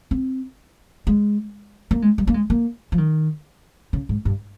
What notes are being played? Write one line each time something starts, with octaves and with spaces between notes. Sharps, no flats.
C4
G#3
A#3
G#3
G3
A#3
G#3
A#3
F3
D#3
C#3
G#2
G2